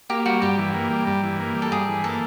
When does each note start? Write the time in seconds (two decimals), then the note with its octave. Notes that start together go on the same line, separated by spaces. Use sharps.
0.09 A#3 G4
0.26 G3 F#4
0.42 G2 G4
0.58 E3
0.74 A#3
0.91 G3
1.07 G2
1.23 E3
1.39 A#3
1.55 G3
1.62 A4
1.71 G2 G#4
1.88 E3
2.04 A#3 A4